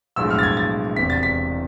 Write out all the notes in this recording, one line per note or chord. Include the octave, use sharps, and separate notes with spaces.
B1 A2 F3 G#3 D4 E6
F6
A6
G#6
A6
E1 E2 C3 B6
A6
B6